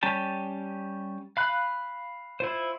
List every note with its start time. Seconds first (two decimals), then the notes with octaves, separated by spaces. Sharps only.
0.03 G3 C#4 G4 A5
1.37 F5 B5 F#6
2.40 E4 F4 C5